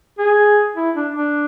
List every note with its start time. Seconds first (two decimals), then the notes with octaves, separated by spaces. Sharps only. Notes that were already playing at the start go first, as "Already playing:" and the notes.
0.19 G#4
0.75 E4
0.95 D4
1.14 D4